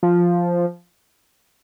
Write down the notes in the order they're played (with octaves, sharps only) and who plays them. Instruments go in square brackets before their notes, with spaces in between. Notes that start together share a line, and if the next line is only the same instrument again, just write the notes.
[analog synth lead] F3